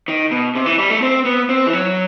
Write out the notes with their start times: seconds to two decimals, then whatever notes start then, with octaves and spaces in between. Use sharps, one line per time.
0.08 D#3
0.31 B2
0.55 C3
0.66 E3
0.78 G3
0.90 A3
1.02 C4
1.25 B3
1.49 C4
1.67 E3
1.73 F#3